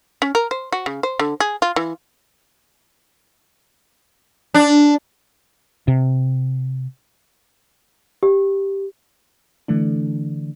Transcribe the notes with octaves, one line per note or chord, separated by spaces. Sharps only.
C#4
A#4
C5
F#4
C#3
C5
D3
G#4
F4
E3
D4
C3
G4
D3 E3 A3 D4